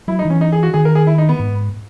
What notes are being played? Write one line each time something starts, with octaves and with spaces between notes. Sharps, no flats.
F#3 E4
D#4
E3 C#4
D#4
G#4
F#4
D#3 G#4
A#4
G#4
E4
D#4
B3
G#2